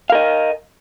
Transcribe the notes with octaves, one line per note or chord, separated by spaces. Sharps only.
A#4 D#5 F5